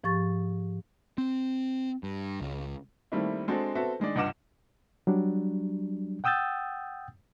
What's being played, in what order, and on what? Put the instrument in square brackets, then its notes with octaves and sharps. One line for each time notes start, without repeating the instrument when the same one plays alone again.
[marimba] G#2 F3 G4 C#6 A6
[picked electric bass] C4
G2
C#2
[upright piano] D#3 G3 A3 A#3 C4 E4
G#3 C4 D4 F#4 A4
B3 C4 F#4 A4 E5
D#3 G#3 D4 D5
C#2 G2 D#5 F#5 D6 E7
[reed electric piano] F#3 G3 D4
F#5 G5 D#6 E6 G6 A6